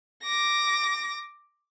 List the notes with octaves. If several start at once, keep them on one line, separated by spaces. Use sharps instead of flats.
D6 A#6